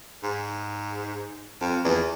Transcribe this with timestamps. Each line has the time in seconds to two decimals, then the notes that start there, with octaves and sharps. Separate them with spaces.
0.23 G#2
1.61 F2
1.85 E2